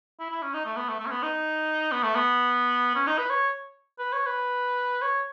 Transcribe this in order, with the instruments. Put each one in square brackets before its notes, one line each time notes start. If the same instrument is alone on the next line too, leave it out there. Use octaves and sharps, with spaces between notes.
[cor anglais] E4
E4
C#4
D#4
A3
B3
A3
A3
C#4
B3
D#4
B3
A3
B3
C#4
D#4
B4
C#5
B4
C#5
B4
C#5